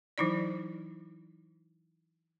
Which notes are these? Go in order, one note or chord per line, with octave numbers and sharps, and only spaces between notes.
E3 F#3 D#4 E4 D5